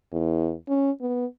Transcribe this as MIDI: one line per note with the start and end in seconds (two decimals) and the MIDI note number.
0.13 0.54 40
0.69 0.91 61
1.01 1.26 59